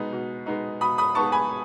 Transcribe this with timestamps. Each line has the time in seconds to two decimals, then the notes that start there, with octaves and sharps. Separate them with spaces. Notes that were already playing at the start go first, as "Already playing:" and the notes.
Already playing: B2 G#3 B3 D#4
0.12 B2
0.46 G#3 B3 D#4
0.81 B2 B5 D#6
0.98 B5 D#6
1.15 G#3 B3 D#4 A5 C#6
1.32 G#5 B5